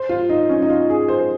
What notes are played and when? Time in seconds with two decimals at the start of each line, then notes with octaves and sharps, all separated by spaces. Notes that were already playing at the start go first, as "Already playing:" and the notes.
Already playing: C5
0.09 F4
0.29 D#4
0.49 C#4
0.62 D#4
0.69 F4
0.90 G#4
1.08 C5